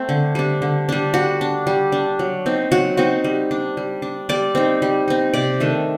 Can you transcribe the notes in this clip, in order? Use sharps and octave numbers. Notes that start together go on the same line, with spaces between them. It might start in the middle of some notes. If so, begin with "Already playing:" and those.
Already playing: A3 C4
D3
G3 D4
D3
G3 D4
G3 F#4
D4
G3
D4
F#3
C4 D#4
F#3 F#4
C4 D#4 F#4
G3
D4
G3
D4
G3 D5
C4 D#4
G3
C4 D#4
C3 D5
D#3 A3 D4